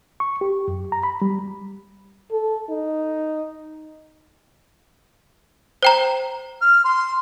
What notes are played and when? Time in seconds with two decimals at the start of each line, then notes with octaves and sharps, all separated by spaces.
0.20 C#6
0.41 G4
0.68 F#2
0.92 A#5
1.03 B5
1.22 G3
2.31 A4
2.70 D#4
5.83 C5 G5 A#5
6.61 F6
6.84 C6